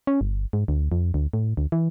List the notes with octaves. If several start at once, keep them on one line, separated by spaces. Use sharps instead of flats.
C#4
G1
G#2
D2
F2
D2
A2
D2
E3